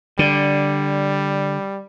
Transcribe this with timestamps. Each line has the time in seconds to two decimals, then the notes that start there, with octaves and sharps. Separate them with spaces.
0.19 D3 G3